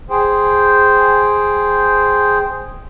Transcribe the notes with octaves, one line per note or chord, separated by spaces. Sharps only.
G#4 C5 G5